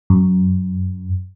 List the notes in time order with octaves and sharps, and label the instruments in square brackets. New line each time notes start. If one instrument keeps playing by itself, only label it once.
[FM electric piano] F#2